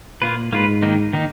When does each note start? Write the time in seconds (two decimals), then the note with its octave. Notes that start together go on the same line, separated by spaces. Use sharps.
0.22 A#2 A#3 F4 B4
0.52 G#2 A#3 F4 B4
0.82 D#3 A#3 D#4
1.13 D#3 A#3 D#4